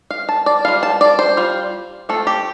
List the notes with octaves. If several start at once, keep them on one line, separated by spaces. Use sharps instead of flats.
F5
A5
D5
G3 F4 F5
A5
D5
C5
G3 F4
A3 C4 F4 A4
G4